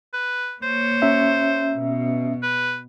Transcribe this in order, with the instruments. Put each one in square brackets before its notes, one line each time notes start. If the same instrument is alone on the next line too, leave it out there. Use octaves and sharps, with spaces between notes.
[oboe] B4
[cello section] A#3 C#5 [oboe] C5
[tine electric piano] C#4 E5
[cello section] B2
[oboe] B4